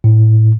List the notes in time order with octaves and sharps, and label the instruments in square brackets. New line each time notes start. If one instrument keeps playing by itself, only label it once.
[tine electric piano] A2